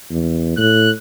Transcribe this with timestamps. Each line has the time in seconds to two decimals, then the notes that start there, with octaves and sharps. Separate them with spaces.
0.10 E2
0.57 A2 F#6